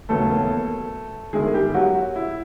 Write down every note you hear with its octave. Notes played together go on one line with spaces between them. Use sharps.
E1 D#2 C#3 F#3 A3 B3 A4
G1 F#2 D#3 G#3 G#4
G3 G4
F#3 F#4
E4